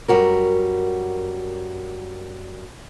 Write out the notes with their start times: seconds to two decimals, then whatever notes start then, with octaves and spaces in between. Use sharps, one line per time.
0.08 F#2 G3 F#4 A#4